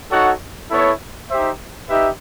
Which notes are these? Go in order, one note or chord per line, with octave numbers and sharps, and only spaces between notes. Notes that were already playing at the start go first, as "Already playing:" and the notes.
D#4 F#4 A4 C#5 F#5
B3 E4 A4 C#5
D#4 G4 C5 E5
D#4 G4 B4 E5